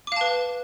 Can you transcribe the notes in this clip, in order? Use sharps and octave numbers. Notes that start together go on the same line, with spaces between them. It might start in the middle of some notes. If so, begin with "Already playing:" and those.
B4 F5 A5 D6